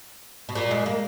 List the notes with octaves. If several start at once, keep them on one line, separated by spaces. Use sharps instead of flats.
B2
A#2
G#3
A#3